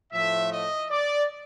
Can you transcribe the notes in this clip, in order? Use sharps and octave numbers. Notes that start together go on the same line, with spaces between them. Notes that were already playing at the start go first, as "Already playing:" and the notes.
A2 F3 A3 E5
D#5
D5